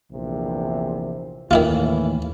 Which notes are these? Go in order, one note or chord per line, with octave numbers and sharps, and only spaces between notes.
A#1 E2 C3
D#2 A2 D#3 E3 E4 F4